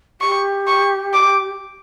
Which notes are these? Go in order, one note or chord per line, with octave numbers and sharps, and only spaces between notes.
G4 C#6
C#6
D6